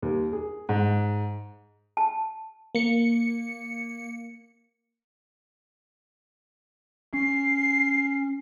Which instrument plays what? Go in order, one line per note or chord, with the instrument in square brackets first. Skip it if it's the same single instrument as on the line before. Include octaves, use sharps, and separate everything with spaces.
[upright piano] D#2
G#4
G#2
[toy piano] A5
[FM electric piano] A#3 C#7
[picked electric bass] C#4 [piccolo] C7